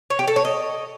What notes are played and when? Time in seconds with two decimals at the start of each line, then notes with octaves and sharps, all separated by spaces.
0.10 C#5
0.19 G4
0.27 A4
0.36 C#5
0.45 D#5